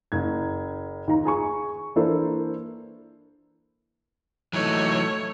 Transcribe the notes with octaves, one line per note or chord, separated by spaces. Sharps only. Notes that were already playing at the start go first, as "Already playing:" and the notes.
F#1 G#6
D#2 D#4 A#5
G#4 G#5 C#6
E3 A#3 D4 E4 A4 C5
E3 F#3 A3 D#4 C#5